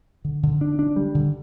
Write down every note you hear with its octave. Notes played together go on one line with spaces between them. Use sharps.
D3
D3
D4
D4
G3
D3